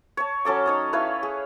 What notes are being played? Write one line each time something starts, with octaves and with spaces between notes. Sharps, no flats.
C#5 A5
F#3 C#4 A4 D6
D#4 C#5 D#6
E4 B4 C#5 F5
G#4